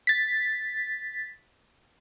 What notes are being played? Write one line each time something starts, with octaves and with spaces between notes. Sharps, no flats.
A6 B6